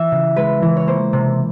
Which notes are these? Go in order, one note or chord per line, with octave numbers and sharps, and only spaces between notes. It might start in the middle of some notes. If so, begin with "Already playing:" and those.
Already playing: E3 E5
C#3
G#3 B4
E3
C#5
A#3 C5
C3